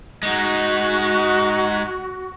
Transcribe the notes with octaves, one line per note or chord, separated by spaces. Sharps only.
G#3 D#4 F#4